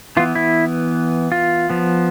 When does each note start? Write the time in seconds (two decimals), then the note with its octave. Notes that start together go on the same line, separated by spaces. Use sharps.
0.17 E3 B3 F4
0.35 E4
1.32 F4
1.70 F3 B3